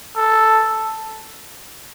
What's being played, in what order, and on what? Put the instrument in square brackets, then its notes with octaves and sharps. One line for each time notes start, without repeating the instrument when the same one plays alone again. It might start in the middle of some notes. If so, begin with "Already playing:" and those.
[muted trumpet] A4